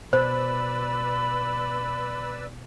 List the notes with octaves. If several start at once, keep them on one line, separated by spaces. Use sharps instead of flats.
B2 B4 C5 D5 B5 E6